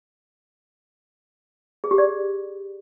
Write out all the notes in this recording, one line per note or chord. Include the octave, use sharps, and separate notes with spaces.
G#4
G4
D5